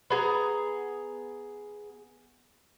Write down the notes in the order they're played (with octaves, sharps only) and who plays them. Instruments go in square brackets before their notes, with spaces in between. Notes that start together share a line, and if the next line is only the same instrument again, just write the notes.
[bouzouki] B3 G#4 A#5